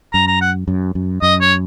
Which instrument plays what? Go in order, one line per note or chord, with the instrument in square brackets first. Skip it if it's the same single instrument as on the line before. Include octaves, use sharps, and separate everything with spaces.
[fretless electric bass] F#2 [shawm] A#5
[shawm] A#5
F#5
[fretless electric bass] F#2
F#2
[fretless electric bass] F#2 [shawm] D#5
[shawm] C#5